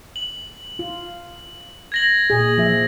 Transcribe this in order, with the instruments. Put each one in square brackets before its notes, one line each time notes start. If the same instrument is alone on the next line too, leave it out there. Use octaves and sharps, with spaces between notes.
[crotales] F#7
[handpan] F4
[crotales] G#6 A#6 F#7
[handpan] A#2 G#4
F3 E5